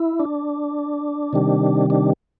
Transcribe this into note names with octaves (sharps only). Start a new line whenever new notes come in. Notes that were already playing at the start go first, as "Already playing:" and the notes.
Already playing: E4
D4
C3 D#3 G3
D4